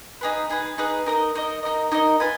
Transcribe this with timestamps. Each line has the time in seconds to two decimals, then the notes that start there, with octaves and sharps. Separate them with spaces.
0.21 D#4 G#4 B4
0.49 D#4 G#4 B4
0.78 D#4 G#4 B4
1.06 D#4 A#4 D#5
1.35 D#4 A#4 D#5
1.63 D#4 A#4 D#5
1.92 D#4 A#4 D#5
2.20 F4 B4 D#5 G#5